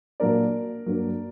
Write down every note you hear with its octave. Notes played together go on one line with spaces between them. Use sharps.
A#2 F#3 A#3 D4 A#4 D5
G2 F#3 A#3 D4